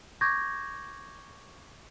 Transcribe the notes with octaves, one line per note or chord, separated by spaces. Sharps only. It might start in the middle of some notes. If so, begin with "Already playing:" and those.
C#6 D6 G6 G#6 A#6